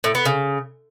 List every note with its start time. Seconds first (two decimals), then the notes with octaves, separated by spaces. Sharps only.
0.04 A2
0.15 B3
0.25 C#3